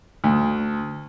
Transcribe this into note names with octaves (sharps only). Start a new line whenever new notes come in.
D2